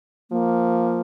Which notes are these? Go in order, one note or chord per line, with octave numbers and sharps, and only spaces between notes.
F3 A#3